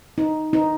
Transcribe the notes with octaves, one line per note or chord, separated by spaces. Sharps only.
D#4
D#4